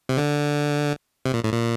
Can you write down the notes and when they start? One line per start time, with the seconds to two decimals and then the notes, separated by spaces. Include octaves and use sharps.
0.09 C3
0.17 D3
1.25 C3
1.34 A#2
1.44 A2
1.52 A#2